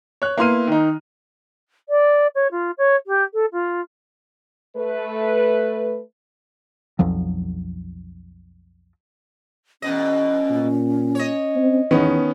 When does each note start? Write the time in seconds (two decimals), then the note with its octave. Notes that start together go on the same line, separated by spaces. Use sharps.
0.22 C#5 F#6
0.37 A#3 B3 E4 C6 F6 D#7
0.67 D#3 D#4
1.89 D5
2.35 C#5
2.51 F4
2.78 C#5
3.06 G4
3.33 A4
3.52 F4
4.75 A3 B4
6.99 B1 F2 F3 F#3
9.82 E2 B2 C#4 D#5
10.50 A#2
11.15 C#5 D#5
11.56 C4
11.91 E2 D#3 B3 C#4